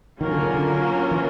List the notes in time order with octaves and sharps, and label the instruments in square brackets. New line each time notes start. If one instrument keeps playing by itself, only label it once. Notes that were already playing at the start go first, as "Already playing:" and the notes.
[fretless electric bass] D#3 [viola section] F#3 A#3 C#4 F4 A#4
[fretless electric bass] D3
C#3
D3
E3